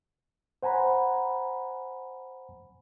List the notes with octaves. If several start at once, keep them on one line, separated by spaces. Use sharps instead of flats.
C5 F#5 G#5 A#5 B5